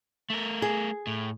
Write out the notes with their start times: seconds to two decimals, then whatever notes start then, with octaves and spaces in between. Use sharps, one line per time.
0.30 A3 A#4
0.62 G#4
1.07 A2